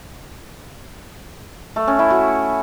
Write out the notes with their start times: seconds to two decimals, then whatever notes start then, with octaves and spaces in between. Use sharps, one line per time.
1.76 A3
1.87 C#4
1.99 E4
2.10 F#4